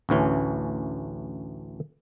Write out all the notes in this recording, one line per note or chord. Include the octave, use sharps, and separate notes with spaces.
A1 D2 E3 C#4